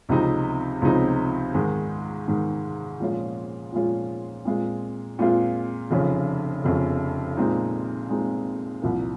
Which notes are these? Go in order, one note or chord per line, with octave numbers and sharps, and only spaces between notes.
C#2 C3 F3 C4 D#4
C#2 C3 F3 C4 D#4
G#2 D#3 G#3
G#2 D#3 G#3
A#2 F3 G#3 C#4 F4
A#2 F3 G#3 C#4 F4
A#2 G#3 C4 F4
A#2 G#3 C4 F4
F1 F2 C#3
F1 F2 C#3
A#2 G#3 C4 D#4
A#2 G#3 C4 D#4
C2 A#2 F3 A#3